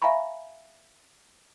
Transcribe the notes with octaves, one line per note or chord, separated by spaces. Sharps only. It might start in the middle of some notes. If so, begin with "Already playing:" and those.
E5 F5 G#5 A#5 B5 C#6